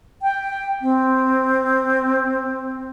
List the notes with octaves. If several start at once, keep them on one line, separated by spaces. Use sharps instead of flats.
G5
C4